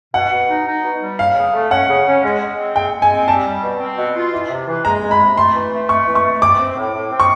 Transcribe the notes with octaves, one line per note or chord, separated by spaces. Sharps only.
B2 F#5
B2
D#4
D#4
B2
G3
C#3 F5
C#3
A3
C#4 F#5
C#3
C#4
G#3
G#3
C4
G#3 G5
G#3
G#5
C4
G3 A5
G3
B2
C4
B2
F4
E3
C3
E3
G#3 A#5
G#3
B5
C3
A3 C6
E3
A3
A3 C#6
E3
C#6
A3
C4 D6
C4
A2
A2
C4
C#6